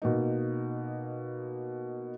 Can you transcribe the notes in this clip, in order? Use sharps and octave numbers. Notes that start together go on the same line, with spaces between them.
B2 A#3 D#4